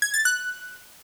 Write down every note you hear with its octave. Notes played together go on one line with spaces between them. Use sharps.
G#6
A6
F#6